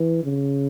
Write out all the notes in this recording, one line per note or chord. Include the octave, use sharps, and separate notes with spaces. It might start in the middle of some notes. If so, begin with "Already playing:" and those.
Already playing: E3
C#3